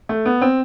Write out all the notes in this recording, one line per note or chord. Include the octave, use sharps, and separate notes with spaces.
A3
B3
C4